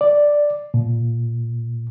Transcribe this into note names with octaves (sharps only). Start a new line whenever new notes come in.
D5
A#2